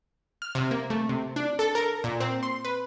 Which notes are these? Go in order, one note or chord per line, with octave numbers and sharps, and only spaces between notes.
F6
C3
A#3
A3
C3
D4
A4
A#4
A#2
C4
C6
B4